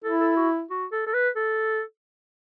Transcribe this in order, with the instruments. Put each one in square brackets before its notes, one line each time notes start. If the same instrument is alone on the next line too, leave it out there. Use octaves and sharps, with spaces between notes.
[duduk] E4 [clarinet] A4
[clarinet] A4
F#4
F#4
A4
A4
B4
A4